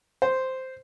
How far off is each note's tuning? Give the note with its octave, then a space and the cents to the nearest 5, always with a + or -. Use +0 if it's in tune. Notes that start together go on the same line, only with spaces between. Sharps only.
C5 -5